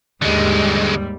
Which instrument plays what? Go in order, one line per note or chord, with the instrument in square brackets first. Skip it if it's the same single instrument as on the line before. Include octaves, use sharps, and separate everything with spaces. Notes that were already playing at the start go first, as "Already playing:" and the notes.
[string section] D#2 G#2 G3 [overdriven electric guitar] D3 G#3